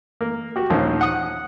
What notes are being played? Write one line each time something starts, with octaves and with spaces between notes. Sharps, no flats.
A#3
F#4 G4
A#1 D#2 F3 C#4 A#4 C5
F#5 D#6